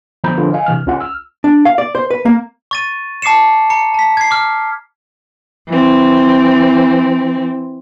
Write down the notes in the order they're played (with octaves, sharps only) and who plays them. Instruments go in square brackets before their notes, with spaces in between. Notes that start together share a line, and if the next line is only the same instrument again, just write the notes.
[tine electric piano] D3 F3 B3 A#5 B5 G6
D3 F3 F4 B4
D#5 F5 G#5
C3 E3 F6
C#2 C#4 F4 F#5
E6 F6
[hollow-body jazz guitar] D4
F5
D5
C5
B4
A#3
[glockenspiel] C#6 A6 D#7
A5 D6 C7 C#7 E7
A#5 C#7
A5 B6
G#6 C7
D6 F6
[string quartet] E3 C4